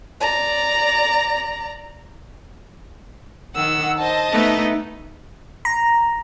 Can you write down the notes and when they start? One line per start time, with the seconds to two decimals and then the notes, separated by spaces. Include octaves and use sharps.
0.20 D5 A#5
3.55 D#3 F#5 E6
3.99 C5 D#5 A5
4.32 A3 B3 D#4
5.65 A#5